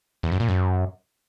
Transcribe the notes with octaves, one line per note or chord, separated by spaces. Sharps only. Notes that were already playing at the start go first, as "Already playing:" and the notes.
E2
F#2
A#2
F#2